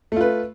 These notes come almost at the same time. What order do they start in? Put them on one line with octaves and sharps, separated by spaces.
A3 F4 B4